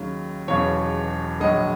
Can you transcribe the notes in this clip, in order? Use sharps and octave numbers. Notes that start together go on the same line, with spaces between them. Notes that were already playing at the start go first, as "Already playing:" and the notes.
Already playing: D#2 C#3 F#3
E1 E2 C#3 F#3 C#5
A#1 G#2 D#3 F#3 D#5